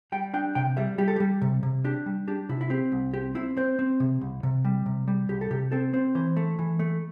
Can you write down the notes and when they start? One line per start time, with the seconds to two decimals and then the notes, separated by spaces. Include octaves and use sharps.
0.12 G3 G5
0.34 D4 G5
0.55 C3 G5
0.77 G3 E5
0.98 G3 G4
1.08 A4
1.16 G3 G4
1.42 C3
1.63 C3
1.84 D4 G4
2.06 G3
2.28 D4 G4
2.49 C3 E4
2.61 E4
2.70 C4 G4
2.92 C2
3.14 C4 G4
3.35 C4 E4
3.57 C4 C5
3.79 C4
4.00 C3
4.21 C2
4.43 C3
4.65 G3
4.86 C3
5.08 G3
5.29 C2 G4
5.41 A4
5.51 C3 G4
5.72 C4 A4
5.93 C4 C5
6.15 E3 C5
6.37 A3
6.59 E3
6.79 A3